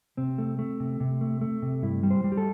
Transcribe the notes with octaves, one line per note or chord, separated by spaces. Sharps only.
C3 C4
A3
A3
C3
C3
A3
A3
C3
G2 E4
G3
C5
G3
G4
A4